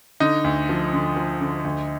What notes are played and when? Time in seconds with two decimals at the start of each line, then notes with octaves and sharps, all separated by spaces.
0.20 D3 D#4
0.44 D2
0.69 F3
0.93 D3
1.16 F3
1.41 D3
1.64 D2